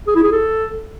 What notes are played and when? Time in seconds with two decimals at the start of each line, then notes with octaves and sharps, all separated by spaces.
0.07 G#4
0.15 E4
0.23 G#4
0.32 A4